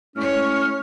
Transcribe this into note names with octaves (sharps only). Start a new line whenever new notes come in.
A2 G#3 C#4 C#5 F6